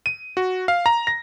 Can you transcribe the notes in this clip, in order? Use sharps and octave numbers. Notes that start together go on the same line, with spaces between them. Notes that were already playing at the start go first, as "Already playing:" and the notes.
D#7
F#4
F5
A#5
A#6